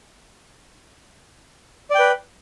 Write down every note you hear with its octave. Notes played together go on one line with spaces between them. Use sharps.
B4 D5 G5